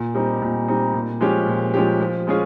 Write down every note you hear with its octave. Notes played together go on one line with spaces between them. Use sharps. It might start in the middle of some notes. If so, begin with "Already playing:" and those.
Already playing: A#2
G3 C4 D#4
A#2
G3 C4 D#4
A#2
F3 G#3 C#4 G4
A#2
F3 G#3 C#4 G4
F3
G#3 C#4 F4 G#4